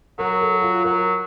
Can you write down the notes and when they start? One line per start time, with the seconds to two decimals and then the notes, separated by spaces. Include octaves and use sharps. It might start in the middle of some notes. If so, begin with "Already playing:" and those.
0.18 F#3 A#4
0.41 A4
0.62 F4
0.84 F#3 A#4